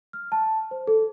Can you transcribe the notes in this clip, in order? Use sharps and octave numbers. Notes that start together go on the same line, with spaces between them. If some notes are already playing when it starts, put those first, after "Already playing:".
F6
A5
C5
A4